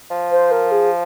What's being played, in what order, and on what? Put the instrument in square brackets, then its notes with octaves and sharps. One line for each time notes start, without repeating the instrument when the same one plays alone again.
[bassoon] F3
[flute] C5
A#4
G#4